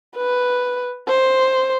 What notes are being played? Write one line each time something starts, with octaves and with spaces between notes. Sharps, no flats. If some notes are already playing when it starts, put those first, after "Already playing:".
B4
C5